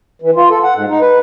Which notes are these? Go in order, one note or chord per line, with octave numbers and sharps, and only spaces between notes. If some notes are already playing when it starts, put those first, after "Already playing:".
E3
F4
A4
F#5
G#2
D#4
B4